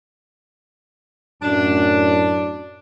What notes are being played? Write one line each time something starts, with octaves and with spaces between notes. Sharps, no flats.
F#2 A2 D4